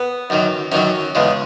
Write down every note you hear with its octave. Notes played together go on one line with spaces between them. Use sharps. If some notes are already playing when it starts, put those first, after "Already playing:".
Already playing: B3
F#2 D#3 F#3
F#2 D#3 F#3 C#4
E2 C#3 G#3